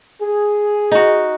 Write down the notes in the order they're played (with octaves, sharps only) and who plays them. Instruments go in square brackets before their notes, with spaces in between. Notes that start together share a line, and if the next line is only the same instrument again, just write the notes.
[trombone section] G#4
[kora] D#4 F#4